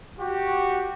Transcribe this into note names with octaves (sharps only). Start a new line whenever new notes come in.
F#4 G4